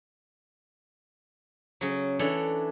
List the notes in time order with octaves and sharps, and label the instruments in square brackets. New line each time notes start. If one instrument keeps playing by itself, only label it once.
[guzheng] C#3 F#3
E3 D4 A4 C#5